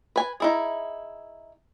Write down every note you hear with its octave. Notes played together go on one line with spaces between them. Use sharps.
B4 G#5
D#4 E4 G#4